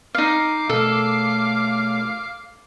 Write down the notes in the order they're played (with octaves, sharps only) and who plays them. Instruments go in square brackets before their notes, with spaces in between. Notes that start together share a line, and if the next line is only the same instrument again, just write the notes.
[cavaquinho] D#4 F5 [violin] D6 C7
[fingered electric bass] B2 A3 [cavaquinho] A4 [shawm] F5